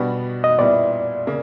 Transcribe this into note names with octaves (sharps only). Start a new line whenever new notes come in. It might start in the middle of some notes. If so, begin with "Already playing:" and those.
Already playing: B2 G3 B3 D4 F#4
D#5
A#2 G3 B3 E4 D5
C#3 A#3